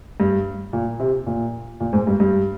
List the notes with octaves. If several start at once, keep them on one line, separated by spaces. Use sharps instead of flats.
G2
A#2
C3
A#2
A#2
G#2
G2
G2